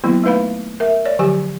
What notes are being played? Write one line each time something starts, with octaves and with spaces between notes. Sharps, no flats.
D#3 F#3 A#3 B3 E4
A3 D#4 B4 F5 B5
A#4 E5
C#5 D5
D3 F3 F#3 G4 G#5